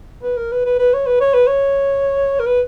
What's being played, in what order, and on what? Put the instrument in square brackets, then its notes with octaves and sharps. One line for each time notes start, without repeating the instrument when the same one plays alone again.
[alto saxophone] B4
A#4
B4
B4
B4
C#5
B4
C#5
B4
C#5
A#4
B4